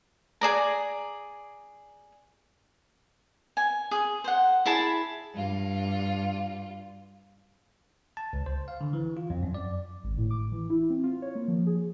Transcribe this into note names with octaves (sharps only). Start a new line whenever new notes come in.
G#4 D5 A#5
G#5
G#4
C5 F#5
E4 G#4 A5 B5
G2 F4
A5
C#2
C5
F5
D3
E3
F4
F2
F#2
D5
G#1
A2
D6
E3
E4
C4
F4
C#5
A#3
F3
G#4